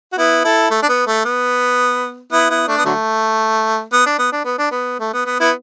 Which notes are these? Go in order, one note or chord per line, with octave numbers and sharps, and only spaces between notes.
F#4
B3 E4
E4 A4
A3
D4
B3
A3
B3
B3 E4
B3 E4
A3 D4
B3
D3 F#3 A3
B3
D4
B3
D4
B3
D4
B3
A3
B3
B3
B3 E4